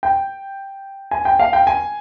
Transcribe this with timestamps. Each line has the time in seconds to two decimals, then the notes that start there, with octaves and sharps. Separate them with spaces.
0.03 G5
1.11 G#5
1.25 G5
1.39 F5
1.53 G5
1.67 G#5